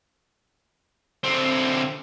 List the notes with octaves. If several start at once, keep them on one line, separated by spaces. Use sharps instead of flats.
D3 C4